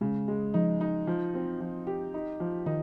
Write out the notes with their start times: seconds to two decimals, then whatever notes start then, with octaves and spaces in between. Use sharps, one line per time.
0.01 C#3 G#3
0.28 G#3
0.54 F3 D#4
0.81 D#4
1.07 F3
1.34 C4
1.60 F3
1.87 G4
2.14 D#4
2.40 F3
2.66 D#3 D#4